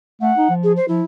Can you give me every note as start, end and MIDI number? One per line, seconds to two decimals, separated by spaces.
0.22 0.32 57
0.22 0.53 78
0.38 0.48 63
0.49 0.77 53
0.64 0.72 68
0.76 0.85 72
0.88 1.02 53
0.88 1.04 64